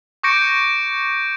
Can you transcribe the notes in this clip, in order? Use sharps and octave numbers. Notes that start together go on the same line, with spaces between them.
C#6 D6 G6 A#6 C#7 D7